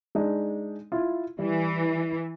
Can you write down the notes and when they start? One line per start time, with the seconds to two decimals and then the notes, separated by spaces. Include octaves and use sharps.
0.15 G#3 D4 D#4
0.92 E4 F4
1.39 E3 G3